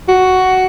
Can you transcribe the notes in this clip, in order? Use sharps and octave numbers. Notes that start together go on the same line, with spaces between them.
F#4